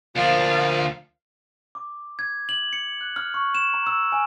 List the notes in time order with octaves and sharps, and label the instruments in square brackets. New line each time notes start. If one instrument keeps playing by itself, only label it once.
[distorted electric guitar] D2 D4 [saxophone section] A#2 F3 [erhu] F5
[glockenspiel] D6
G#6
F#7
C#7
F#6
F6
C#6
E7
A#5
E6
G#5